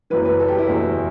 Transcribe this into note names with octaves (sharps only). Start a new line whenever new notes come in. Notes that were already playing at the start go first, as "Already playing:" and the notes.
F#1 F#2 E3 B4
B4
A4
G4
E4
F#1 E2 B2